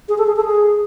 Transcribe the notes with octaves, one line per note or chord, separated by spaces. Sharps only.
G#4
A4
G#4
A4
G#4